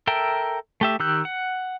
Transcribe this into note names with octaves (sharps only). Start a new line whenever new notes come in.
A4 A#4 E5 G5
A3 G4 E5
D#3 G4 E6 F#6 G6
F#5